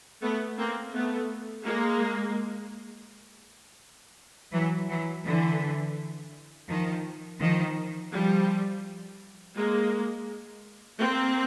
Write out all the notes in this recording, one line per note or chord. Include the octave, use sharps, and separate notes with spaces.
A3 B3
A#3 C4
A3 B3
G#3 A#3
E3 F#3
E3 F#3
D3 E3
D#3 F3
D#3 F3
F3 G3
G#3 A#3
A#3 C4